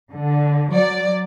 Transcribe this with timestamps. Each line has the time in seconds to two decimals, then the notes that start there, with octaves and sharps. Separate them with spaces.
0.12 D3
0.72 F#3 D5